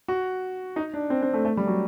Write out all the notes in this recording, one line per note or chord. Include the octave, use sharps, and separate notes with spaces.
F#4
D#4
D4
C4
C4
A3
A3
G3
F#3